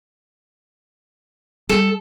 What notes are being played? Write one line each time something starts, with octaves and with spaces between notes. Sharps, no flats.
G3 A4